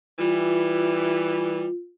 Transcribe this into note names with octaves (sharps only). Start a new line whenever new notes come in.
E3 G3 F4